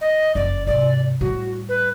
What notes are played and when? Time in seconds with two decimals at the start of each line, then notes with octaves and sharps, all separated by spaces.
0.01 D#5
0.35 F#1 F2 D5
0.67 G#2 C3 D5
1.21 A2 G3 F#4
1.69 B4